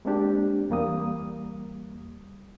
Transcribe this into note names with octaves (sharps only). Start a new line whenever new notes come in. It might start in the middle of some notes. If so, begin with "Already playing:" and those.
G#3 A#3 C4 D4 G4
E2 G3 A#3 D#6